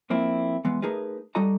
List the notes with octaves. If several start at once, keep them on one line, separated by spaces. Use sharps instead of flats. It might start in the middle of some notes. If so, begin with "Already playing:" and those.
F2 A#3 C4 E4
E3 G#3 B3
A3 D#4 G#4 A#4 B4
G3 D#4 F#4 A4 D#5 A#5